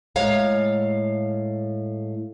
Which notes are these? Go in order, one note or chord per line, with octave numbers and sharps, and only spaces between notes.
A2 G#3 C#5 F5 A#5